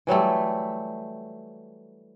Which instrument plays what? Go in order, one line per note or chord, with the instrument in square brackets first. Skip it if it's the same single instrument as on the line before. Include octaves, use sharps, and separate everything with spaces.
[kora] E3 F#3 G3 A3